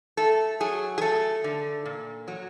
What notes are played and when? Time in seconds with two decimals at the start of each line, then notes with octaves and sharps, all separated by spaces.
0.17 A3 A4
0.60 F#3 G#4
0.98 G#4
1.01 A3 A4
1.44 D3
1.85 A#2
2.28 F#3